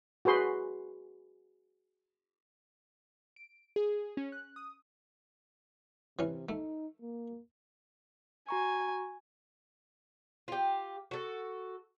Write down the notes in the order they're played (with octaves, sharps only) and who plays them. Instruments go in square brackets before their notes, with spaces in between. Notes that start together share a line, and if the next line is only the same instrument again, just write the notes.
[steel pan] F#4 G#4 B4 C6
[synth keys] D7
G#4
C#4
F#6
D#6
[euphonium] C3 [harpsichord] E3 C#4
[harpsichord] A3 [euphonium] D#4
[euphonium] A#3
[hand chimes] F#4 A#5 C#6 [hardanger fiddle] G#5
[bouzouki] F4 G4
F#4 A4